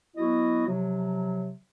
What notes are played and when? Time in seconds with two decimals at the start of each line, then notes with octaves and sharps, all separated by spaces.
0.17 F#3 B3 E4 F#4 D#5
0.66 C3 F3 F#3